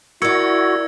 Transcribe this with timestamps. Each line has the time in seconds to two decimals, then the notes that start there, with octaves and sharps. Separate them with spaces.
0.22 E4 F#4 A#4 D5 E6 G#6 C#7